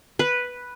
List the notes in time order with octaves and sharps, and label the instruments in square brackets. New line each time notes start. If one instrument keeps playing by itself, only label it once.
[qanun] B4